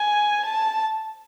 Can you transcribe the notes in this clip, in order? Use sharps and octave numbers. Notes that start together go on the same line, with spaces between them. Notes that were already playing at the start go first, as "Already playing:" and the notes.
Already playing: G#5
A5